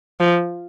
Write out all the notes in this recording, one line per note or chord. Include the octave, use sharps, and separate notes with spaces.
F3